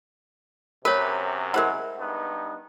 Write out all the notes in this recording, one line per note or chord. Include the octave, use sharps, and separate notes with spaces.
F#2 C3 A#4 B4 C#5
G#3 E4 A#4 C5 F#5
G2 B3 D#4